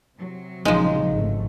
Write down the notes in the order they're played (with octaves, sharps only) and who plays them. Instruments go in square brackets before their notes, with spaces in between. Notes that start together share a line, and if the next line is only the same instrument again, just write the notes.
[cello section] C3 F#3
[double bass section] A#1 C#3 [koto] F3 G#3 [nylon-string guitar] D#4
[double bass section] G#1 A3